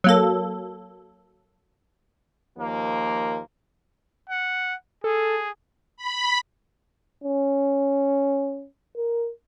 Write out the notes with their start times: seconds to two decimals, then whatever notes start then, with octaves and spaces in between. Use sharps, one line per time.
0.04 F#3 A#3 A4
2.58 D#2 F3 A#3
4.29 F#5
5.04 G#4 A4
5.97 B5
7.24 C#4
8.96 A#4